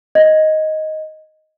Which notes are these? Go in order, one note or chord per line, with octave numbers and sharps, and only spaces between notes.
D#5 G#6